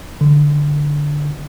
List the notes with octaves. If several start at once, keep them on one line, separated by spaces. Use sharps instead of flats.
D3